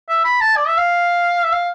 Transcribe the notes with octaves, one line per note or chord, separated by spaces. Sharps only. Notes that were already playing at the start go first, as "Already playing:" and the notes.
E5
B5
A5
D5
E5
F5
E5
F5